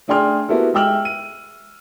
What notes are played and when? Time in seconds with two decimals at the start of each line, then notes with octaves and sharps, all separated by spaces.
0.08 A3 D4 G#4 G5 C6 F6
0.49 A#3 B3 E4 F#4 G4 A4
0.74 G#3 E5 G5 E6 F6 F#7
1.05 D#7